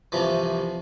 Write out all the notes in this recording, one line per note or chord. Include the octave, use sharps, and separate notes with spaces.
C2 C3 E3 F3